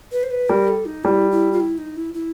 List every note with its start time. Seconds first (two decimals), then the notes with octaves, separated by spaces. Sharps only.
0.12 B4
0.23 C5
0.31 B4
0.49 G3 A#4
0.68 A4
0.85 D#4
1.04 G3 E4 F4
1.31 E4
1.52 F4
1.60 E4
1.78 D#4
1.96 E4
2.14 E4